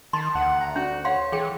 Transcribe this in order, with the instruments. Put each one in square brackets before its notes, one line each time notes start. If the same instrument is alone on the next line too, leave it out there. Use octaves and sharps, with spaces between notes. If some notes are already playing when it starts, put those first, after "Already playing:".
[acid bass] D#3 [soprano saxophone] A5 [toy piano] C6
[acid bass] D2 [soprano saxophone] F#5
[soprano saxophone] A#5
[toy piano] C#4 [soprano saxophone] F#4
[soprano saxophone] C#5 [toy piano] F5 F#5 C6
[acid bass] E3 [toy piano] G#4 G5